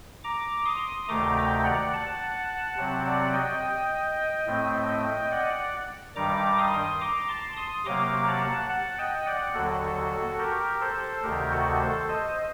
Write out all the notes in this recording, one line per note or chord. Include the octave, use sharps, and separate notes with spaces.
A#5 D6
C6 D#6
D2 C3 D#3 A3 A#5 D6
G5 A#5
D5 F#5
F#5 A5
C3 F#3 C4 F#5 A5
D5 F#5
D#5 G5
A2 A3 C4
D5 F#5
G2 D#3 G3 A#5 D6
C6 D#6
A#5 D6
A5 C6
C6 D#6
C3 F#3 A#3 A#5 D6
F#5 A5
F#5 A5
D#5 G5
D5 F#5
D#2 D3 F#3 F#4 A4
G4 A#4
A4 C5
D2 C3 D#3 G4 A#4
F#4 A4
A4 C5
C5 D#5